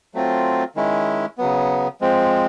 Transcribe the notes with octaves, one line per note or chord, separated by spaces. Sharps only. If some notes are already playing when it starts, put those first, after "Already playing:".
F#3 A3 C4 F4
D#3 G#3 C#4 E4
C#3 F#3 B3
F3 G#3 C4